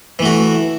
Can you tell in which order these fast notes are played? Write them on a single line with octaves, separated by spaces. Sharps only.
E3 A3 F#4